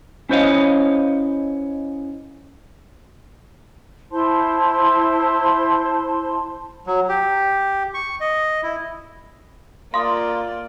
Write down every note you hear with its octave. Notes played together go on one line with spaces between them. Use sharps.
C#4 E4 C5 C#5 D#5 F5
E4 C5 A5 C6
F#3
G4
C#6
D#5
E4
A#3 F4 D5 F5 C6 D#6